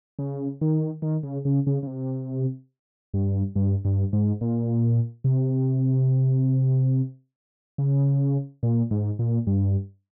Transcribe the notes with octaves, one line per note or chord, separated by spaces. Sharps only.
C#3
D#3
D#3
C#3
C#3
C#3
C#3
C3
G2
G2
G2
G#2
A#2
C3
C#3
A#2
G#2
A#2
G2